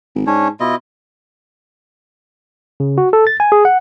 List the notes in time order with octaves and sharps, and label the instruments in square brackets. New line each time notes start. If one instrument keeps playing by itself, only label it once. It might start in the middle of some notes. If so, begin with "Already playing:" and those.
[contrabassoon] G#1
[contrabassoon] G#2 [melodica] C#4 D4 C#5
[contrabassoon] B2 [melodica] E4 F4 D#5
[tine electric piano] C#3
F#4
A4
A6
G#5
G#4
F#5